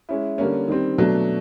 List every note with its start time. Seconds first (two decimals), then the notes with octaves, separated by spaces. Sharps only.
0.09 G#3 C#4 E4
0.38 D3 G3 A#3 C#4
0.68 D#3 G3 C4
0.98 B2 F#3 A3 D4